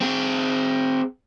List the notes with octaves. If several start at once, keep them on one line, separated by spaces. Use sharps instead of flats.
C4 G#4